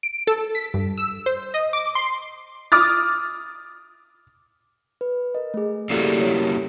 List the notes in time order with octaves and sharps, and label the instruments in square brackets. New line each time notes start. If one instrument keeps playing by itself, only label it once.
[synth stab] D7
A4
B6
G2
E6
C5
D#5
D6
C6
[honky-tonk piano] D6 D#6 F6 A6
[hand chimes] B4
A#4 D#5
A3 G#4
[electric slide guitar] A#3 E4 F#4 [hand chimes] G4 A4 D5
[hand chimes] G4 C#5